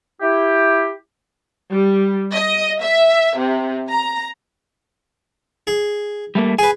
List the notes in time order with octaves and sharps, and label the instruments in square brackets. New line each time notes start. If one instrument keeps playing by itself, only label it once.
[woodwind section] E4 G4
[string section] G3
D#5
E5
C3
A#5
[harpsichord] G#4
[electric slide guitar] G3 A3 A#3
[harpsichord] G#4 B4 [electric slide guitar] G#5